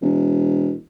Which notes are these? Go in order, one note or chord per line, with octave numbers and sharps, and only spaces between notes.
E1